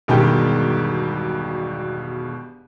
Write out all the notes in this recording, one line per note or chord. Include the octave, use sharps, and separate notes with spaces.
E1 G2 B2 D#3 G#3 G4